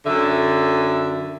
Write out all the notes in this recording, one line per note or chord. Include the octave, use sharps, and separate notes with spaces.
F#2 D3 E5